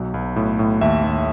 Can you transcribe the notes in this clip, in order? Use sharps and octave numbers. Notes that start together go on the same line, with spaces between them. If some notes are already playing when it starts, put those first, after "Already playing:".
Already playing: B1 F#3
B1
A2
A2
D#2 E5
D#2